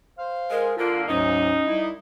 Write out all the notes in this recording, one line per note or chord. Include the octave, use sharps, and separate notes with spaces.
C5 F5
G#3 A#4
D3 A#3 F4
D2 G#2 F#3 C#4 D#4
C2 E4